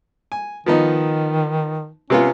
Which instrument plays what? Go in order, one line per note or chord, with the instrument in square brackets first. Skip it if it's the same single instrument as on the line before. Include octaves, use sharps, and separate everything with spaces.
[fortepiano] G#5
[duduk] D#3 [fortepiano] F3 B3 D#4
[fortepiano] C3 B3 F4 [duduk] C#4